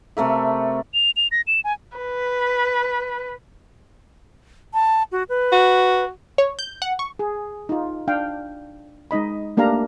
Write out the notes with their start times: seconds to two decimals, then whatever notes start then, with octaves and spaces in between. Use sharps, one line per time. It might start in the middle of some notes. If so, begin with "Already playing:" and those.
0.17 C3 A3 A#4 E5
0.94 F7
1.16 F7
1.32 A#6
1.47 E7
1.64 G#5
1.98 B4
4.74 A5
5.12 F#4
5.29 B4
5.52 F#4
6.38 C#5
6.59 G6
6.82 F#5
6.99 C#6
7.19 G#4
7.69 D#4 F4
8.08 D4 F5 G5
9.11 G#3 D#4 D#5 B5
9.57 A3 A#3 D4 G4 F5 A#5